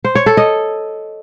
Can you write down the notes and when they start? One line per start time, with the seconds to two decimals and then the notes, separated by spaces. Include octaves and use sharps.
0.05 C5
0.15 C#5
0.26 A4
0.37 D#5